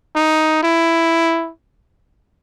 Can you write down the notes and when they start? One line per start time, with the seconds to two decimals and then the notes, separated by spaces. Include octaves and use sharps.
0.16 D#4
0.63 E4